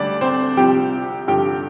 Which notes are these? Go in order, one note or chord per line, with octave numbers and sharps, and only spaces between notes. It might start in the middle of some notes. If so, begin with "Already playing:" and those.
Already playing: D2 D3 G3 D4 D5
C4 C5
C2 C3 F3 G4 G5
G2 D3 F3 G4 G5